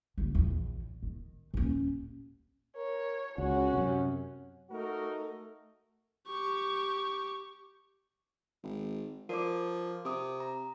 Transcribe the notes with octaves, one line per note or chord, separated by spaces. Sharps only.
F#1 D3
A#1 E2
D#3
D#1 C#4
A#4 C#5
C#2 C#4 F#4
F#2 C3
A3 D#4 F#4 A#4
G4 C#6
G#1
F3 A#4 D5 D6
C3 D6 D#6
A#5